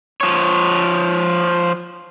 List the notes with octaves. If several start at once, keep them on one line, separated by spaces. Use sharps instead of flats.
F3 C#5